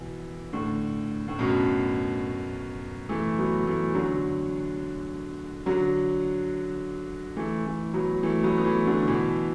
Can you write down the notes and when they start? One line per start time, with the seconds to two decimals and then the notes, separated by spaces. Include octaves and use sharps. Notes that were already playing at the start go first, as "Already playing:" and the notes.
Already playing: B2 E3
0.53 A2 D3
1.28 A2
1.39 F#2 B2
3.09 E3 A3
3.38 F#3 B3
3.67 E3 A3
3.94 D3 F#3
5.66 D3 F#3
7.36 E3 A3
7.66 E3 A3
7.93 F#3 B3
8.23 E3 A3
8.44 F#3 B3
8.58 B3
8.65 E3 A3
8.87 D3 F#3
9.08 B2 E3